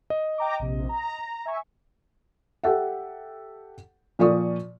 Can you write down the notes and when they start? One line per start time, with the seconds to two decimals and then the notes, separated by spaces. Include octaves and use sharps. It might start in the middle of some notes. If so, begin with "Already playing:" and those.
0.10 D#5
0.38 G5 A#5 D6
0.59 A#1 C3
0.89 A#5
1.46 E5 G#5 C#6
2.64 G4 A4 E5 F#5
4.19 A#2 F3 D5 C#6 D#6